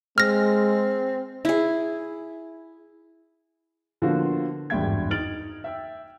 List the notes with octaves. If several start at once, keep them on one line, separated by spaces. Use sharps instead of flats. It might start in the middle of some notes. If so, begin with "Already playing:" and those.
G#3 C4 F6 A#6
E4 G#4
D3 F3 A#3 B3 F4 F#4
G#1 E2 G2 E5 G5 G#6
D#4 F6 A6 D7 F#7
E5 G5 E6